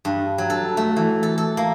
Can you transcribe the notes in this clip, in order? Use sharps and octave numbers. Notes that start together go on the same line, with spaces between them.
G2
F#3
A4
A3
E3
A4
A4
A#3